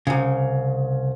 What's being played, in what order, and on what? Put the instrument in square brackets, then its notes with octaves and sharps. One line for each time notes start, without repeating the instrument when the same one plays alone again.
[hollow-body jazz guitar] C2 C#3